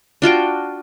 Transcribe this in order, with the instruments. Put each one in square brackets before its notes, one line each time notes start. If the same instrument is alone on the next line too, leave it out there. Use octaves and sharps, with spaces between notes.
[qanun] D4 F4 F#4 G5